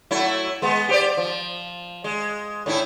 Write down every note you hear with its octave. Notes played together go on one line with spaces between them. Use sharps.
F#3 A3 E4
G#3 B3
G4 C5 D5
F3
G#3
A2 D#4 E4